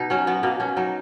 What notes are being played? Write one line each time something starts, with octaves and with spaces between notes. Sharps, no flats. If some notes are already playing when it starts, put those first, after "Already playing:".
Already playing: B2 D#4
F#3 C#4
F#3 B3
B2 A#3
B2 C#4
F#3 D#4